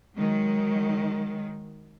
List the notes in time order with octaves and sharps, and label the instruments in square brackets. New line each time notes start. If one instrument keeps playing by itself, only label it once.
[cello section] D#3 F#3 G#3